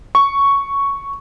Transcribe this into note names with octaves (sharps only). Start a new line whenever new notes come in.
C#6